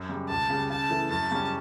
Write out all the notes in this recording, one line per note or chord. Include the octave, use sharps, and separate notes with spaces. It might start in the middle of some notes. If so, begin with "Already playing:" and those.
Already playing: F#2
C#3 G3
C#2 A5
C#3 G3
C#3 A5
E3 A3
F#2 A5
C#3 G3 C#4